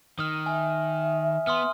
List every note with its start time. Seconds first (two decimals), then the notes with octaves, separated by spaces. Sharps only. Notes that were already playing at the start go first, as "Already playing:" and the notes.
0.19 D#3 D#6 F6
0.46 E5 G#5
1.47 B3 C6 D#6 F6